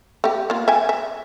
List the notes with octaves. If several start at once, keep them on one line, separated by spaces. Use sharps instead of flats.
A3 G4
A#3 F4
E5 G5 G#5
E5